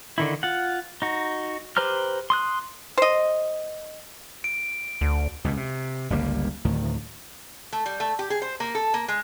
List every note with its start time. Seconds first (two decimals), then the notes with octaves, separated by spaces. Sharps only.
0.18 D3 D#3 E4
0.43 F4 F#5
1.02 D#4 F#4
1.77 G4 B4 C5 A#5 F6
2.30 C6 D#6 F#6
2.98 C5 D#5
4.44 D7
5.01 D2
5.44 C#2 B2
5.57 C3
6.10 G1 C#2 G3 A#3
6.65 D2 A2 D#3
7.73 A3
7.86 G3
8.00 A3
8.19 G4
8.30 G#4
8.42 C5
8.60 A#3
8.75 A4
8.94 A#3
9.08 G#3